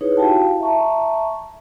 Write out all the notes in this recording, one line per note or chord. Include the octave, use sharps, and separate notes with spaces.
D#4 E4 G#4 B4 C#5
E4 F#4 G4 F5 G5 A5
E5 A5 A#5 C#6